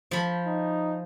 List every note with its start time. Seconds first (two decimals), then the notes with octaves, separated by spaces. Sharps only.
0.11 F3 B5
0.47 D#4